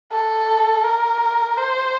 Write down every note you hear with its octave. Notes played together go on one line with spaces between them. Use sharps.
A4
A#4
C5